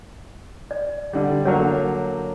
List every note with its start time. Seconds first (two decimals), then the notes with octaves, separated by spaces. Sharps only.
0.71 D5
1.13 D3 G3
1.45 D3 F#3 A#3 C#5 F#5